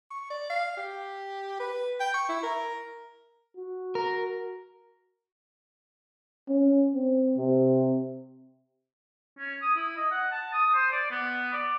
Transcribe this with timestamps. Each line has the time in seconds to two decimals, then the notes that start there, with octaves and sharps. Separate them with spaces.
0.11 C#6
0.30 D5
0.50 F5
0.77 G4
1.60 B4
2.00 G5
2.14 C#6
2.29 E4
2.43 A#4
3.57 F#4
3.95 A#4
6.49 C#4
6.95 C4
7.37 C3
9.38 C#4
9.62 D#6
9.76 E4
9.96 D#5
10.11 F#5
10.31 A5
10.53 D#6
10.74 C5
10.92 D5
11.11 B3
11.53 D5